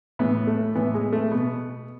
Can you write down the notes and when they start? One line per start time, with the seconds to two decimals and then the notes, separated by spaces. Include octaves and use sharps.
0.19 A2 E3 B3
0.47 A3
0.75 A2 E3 B3
0.94 G#3
1.13 A3
1.31 B2 B3